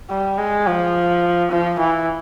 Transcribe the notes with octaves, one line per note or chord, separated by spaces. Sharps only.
G3
G#3
F3
F3
E3